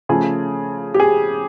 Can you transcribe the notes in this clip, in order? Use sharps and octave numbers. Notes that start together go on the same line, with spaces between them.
C#3 F3 A3 G#4
G4
G#4